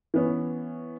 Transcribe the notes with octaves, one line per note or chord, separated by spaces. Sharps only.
E3 B3 C#4